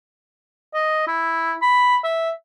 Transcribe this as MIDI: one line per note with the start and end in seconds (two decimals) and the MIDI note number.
0.74 1.03 75
1.07 1.55 64
1.62 1.97 83
2.04 2.30 76